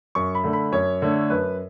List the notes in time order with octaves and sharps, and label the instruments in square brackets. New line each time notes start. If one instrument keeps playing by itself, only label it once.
[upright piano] F#2 C#6
B5
D3 A3
B5
F#2 C#5
D3 A3
F#2 B4